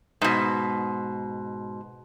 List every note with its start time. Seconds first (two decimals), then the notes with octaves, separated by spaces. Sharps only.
0.21 G#2 B2